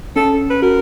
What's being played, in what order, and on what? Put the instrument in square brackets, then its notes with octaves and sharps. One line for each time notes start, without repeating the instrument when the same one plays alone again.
[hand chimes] C#4 [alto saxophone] A4
[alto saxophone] B4
[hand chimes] F#4 [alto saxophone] A#4